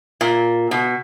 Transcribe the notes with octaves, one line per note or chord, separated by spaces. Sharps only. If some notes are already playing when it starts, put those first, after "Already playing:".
A#2
B2